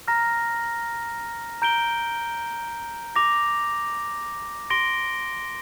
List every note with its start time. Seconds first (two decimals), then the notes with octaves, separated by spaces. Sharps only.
0.08 A#5 F6 A#6
1.62 A#5 G6 D7 G7
3.16 D6 A#6 F7
4.70 C6 A#6 D7 G7